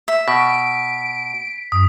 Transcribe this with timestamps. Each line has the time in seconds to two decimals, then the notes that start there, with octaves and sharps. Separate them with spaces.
0.08 E5
0.28 B2 B6 D7
1.72 F#2 D#6